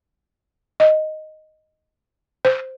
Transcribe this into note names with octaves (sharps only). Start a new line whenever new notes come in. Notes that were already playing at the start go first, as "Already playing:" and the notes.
D#5
C5